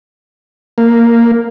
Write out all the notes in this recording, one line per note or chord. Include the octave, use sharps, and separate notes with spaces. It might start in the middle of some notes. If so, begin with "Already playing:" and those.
A#3